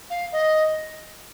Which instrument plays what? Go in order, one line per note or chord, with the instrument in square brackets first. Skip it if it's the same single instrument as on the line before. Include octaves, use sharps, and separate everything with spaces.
[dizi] F5
D#5